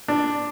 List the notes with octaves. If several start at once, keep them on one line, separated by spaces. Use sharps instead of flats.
D4